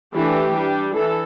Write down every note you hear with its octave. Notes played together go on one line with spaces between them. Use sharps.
E3 A3 D4 G4
G3 D4
E3 A4